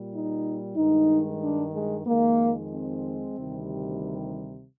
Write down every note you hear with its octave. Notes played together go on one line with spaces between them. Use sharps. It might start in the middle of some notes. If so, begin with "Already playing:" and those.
Already playing: A#2 G3
D#4
G2 D#3 G#3 D#4
D4
G#3
F2 D#3 G#3 A#3
C4
D2 C3 D#3 G3